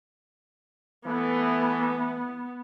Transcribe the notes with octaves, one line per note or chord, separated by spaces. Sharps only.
E3 A3 B3